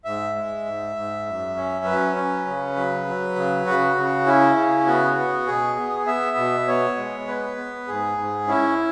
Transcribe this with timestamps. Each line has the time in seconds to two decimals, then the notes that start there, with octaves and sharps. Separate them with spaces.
0.05 G#2 E5
0.35 G#3
0.66 G#2
0.96 G#2
1.26 F#2
1.56 C#4
1.85 F#3 B4
2.16 C#4
2.47 C#3
2.76 F#3
3.07 F#3
3.36 C#3
3.66 C#3 F#4
3.96 C#3
4.27 C#4 E4
4.57 C#3
4.87 B3 F#4
5.17 B3
5.47 B2 G#4
5.77 B3
6.07 B3 E5
6.37 B2
6.67 B3 C#5
6.97 G#3
7.27 B3 B4
7.57 B3
7.88 G#2 G#4
8.18 G#2
8.48 C#4 E4